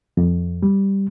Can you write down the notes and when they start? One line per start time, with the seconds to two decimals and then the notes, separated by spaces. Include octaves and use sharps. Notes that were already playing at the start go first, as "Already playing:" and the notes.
0.17 F2
0.63 G3